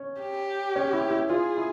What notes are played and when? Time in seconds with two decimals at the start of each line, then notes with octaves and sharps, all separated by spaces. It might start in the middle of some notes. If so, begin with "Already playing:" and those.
Already playing: C#4
0.20 G4
0.75 C#4
0.93 E4
1.11 E4
1.29 F4 G#4
1.57 E4